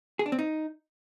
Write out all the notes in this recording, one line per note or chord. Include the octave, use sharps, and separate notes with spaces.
G#4
D4
C4
D#4